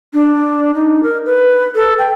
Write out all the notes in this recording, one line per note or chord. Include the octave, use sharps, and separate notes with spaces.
D4
D#4
A#4
B4
A4
G5